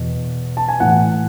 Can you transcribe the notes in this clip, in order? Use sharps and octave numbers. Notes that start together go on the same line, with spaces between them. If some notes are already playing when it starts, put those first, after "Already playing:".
Already playing: E2 B2
A5
G#5
A2 E3 F#5